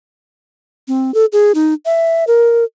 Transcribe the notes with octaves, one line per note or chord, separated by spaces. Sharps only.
C4
A4
G#4
D#4
E5
A#4